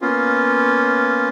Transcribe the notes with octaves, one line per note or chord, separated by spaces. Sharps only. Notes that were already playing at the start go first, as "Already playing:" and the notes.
A#3 B3 C#4 F4